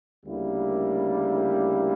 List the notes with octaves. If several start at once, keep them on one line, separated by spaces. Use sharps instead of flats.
D2 C#3 G3 A#3 E4